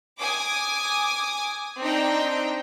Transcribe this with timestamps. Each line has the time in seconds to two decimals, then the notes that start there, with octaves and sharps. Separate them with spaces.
0.20 G#5 D6 D#6
1.80 C4 D4 D#4 G5